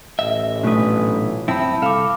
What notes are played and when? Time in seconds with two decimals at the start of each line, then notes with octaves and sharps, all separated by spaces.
0.19 A1 D#5 E5
0.64 B1 A#2 A3 D4 F4 B4 G#5 D#6
1.48 F#2 C4 E4 G5 A5 B5 E6
1.82 C2 A4 F5 D6 F6